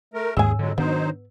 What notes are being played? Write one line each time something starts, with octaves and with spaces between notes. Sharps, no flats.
A3 A#4
D#2 G#2 C#4 G#4 G#5 E6
F2 D3 F#3 G#3
D#3 F#3 B3 D4 D#4 C5